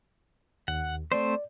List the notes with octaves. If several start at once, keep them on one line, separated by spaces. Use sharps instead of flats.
D#2 F#5
A3 C4 C5 D5